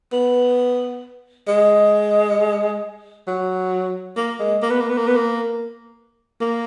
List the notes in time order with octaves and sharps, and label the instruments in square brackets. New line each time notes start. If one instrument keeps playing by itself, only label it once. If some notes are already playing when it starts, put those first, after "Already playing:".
[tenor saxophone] B3
G#3
F#3
A#3
G#3
A#3
B3
A#3
B3
A#3
B3
A#3
A#3